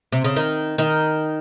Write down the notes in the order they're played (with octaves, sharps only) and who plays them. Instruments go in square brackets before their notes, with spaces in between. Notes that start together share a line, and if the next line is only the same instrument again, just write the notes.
[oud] C3
C#3
D#3
D#3